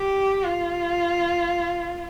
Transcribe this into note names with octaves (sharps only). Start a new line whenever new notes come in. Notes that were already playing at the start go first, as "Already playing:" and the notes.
Already playing: G4
F4